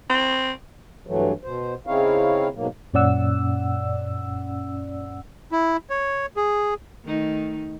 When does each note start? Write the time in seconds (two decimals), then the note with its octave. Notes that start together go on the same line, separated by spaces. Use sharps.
0.10 C4
1.07 G2 E3 F#3 A3
1.44 B2 C5
1.87 C#3 C4 D#4 E4 C#5 F5
2.55 G#2 B2 F#3 A#3
2.94 F#2 A#2 C#4 D5 F#5 E6
5.52 E4
5.90 C#5
6.37 G#4
7.05 D#3 A3 D#4